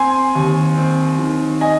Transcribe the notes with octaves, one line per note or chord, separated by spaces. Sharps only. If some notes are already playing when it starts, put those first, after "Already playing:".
Already playing: C4 G#5 C6
D#2
C4
D#3
D#5 G#5